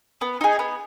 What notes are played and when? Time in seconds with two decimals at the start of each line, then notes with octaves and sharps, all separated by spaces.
0.21 B3
0.41 D#4 G#4
0.59 B3